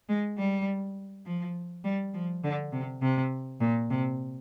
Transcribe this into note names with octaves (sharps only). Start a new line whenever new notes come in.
G#3
G3
F3
G3
F3
D3
C3
C3
A#2
C3